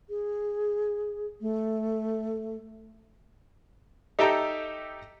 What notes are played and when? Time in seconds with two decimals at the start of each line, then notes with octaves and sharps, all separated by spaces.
0.09 G#4
1.41 A3
4.19 D#4 G4 A4 E5 G5 A#5